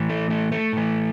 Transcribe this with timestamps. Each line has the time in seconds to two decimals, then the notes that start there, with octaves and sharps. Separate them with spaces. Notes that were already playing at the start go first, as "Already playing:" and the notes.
Already playing: A2 E3
0.09 A3
0.30 A3
0.52 A3
0.73 A2 E3